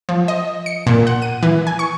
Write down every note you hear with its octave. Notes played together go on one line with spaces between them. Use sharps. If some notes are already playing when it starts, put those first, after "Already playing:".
F3
D#5
C#7
A#2
F#5
D#7
E3
G#5
C#6